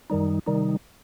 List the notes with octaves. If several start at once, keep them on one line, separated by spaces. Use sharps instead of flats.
F#2 D#3 G3 D#4
C3 D#3 G3 D#4